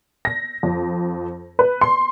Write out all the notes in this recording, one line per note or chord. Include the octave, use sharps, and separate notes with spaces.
A#6
F2
B4
C6